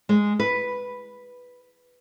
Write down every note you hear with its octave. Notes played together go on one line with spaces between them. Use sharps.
G#3
B4